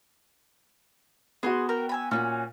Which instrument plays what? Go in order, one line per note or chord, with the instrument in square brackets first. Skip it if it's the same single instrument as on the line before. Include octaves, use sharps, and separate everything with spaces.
[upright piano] B3 F#4 [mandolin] G#4 C6 D#6
[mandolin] A#4 G5
E5 G#5 B5
[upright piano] A#2 [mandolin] C#4 D#4 F#4